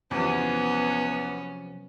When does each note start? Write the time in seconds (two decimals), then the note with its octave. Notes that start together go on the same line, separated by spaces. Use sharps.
0.11 E2 C3 F3 F#3 B3 C#4